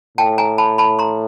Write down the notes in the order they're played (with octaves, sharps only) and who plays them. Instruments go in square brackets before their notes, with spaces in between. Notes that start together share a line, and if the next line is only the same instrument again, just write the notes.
[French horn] A2 [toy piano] G5 A5
[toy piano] G#5 A#5
A5 B5
A5 B5
A#5 C6